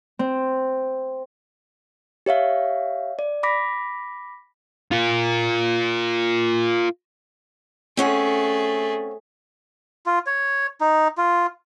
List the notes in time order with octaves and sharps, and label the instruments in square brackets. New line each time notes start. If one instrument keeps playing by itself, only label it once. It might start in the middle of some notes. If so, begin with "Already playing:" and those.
[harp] C4
[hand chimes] G4 C#5 E5 F5
D5
B5 D6 A#6 B6
[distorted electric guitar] F4 A#4
[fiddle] A3 G#4 [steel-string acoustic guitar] C4 C#4 F#5
[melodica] F4
C#5
D#4
F4